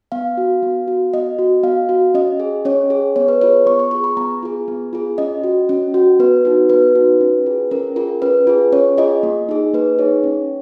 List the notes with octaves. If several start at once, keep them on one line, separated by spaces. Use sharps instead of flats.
B3 F5
F#4
B3
F#4
B3 D#5
F#4
B3 F5
F#4
C#4 D#5
G#4
C#4 C#5
G#4
B3 C#5
B4
F4 G#4 C#5
B3 C#6
C#6
F4 G#4 C#6
B5
B3 A#5
F4 G#4
B3
F4 G#4
C#4 D#5
F#4
C#4
F#4
B3 B4
D#4 F#4
B3 B4
D#4 F#4
C#4
F4 G#4
C#4 A#4
F4 G#4 A#4
C#4 B4
F4 G#4
C#4 C#5
F4 G#4 D#5
A#3
D#4 G#4
A#3 B4
D#4 G#4 C#5
C#4